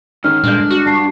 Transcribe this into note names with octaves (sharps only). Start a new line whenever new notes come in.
G#2 D#3 C#4 F6
G1 A#2 G#3 D4 G6
F#4
G2 A5 C7